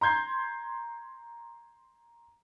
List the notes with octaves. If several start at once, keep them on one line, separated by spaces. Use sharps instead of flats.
A#5 C6 G6 G#6 C7